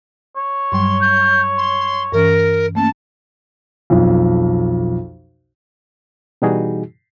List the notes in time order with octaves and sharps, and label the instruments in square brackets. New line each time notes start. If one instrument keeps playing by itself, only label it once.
[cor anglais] C#5
[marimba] G2 F#3 G3 [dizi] C6
[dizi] G6
C6
[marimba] G2 E3 C#4 [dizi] A#4
[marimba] A3 A#3 C#4 [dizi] A5
[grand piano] B1 F2
[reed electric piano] B2 E3 G3 D#4 F#4 G#4